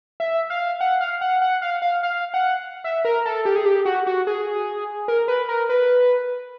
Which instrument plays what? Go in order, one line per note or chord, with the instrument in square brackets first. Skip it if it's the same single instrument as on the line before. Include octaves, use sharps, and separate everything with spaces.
[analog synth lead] E5
F5
F#5
F5
F#5
F#5
F5
F5
F5
F#5
E5
A#4
A4
G4
G#4
G4
F#4
F#4
G#4
A#4
B4
A#4
B4